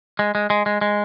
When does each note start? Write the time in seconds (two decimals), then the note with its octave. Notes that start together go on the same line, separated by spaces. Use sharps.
0.19 G#3
0.35 G#3
0.50 G#3
0.66 G#3
0.81 G#3